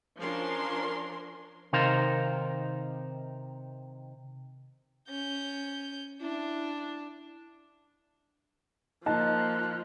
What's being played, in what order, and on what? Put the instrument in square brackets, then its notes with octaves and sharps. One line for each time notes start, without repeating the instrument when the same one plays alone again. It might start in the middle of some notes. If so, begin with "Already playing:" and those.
[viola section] F3 C#4 D4 A#4 C6
[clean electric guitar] C3 D#3 D#4 A#4 C5 F5
[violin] C#4 G6
[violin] D4 [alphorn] E4
[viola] F3 [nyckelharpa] A#3 [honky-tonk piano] D#4 A5 [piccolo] F#6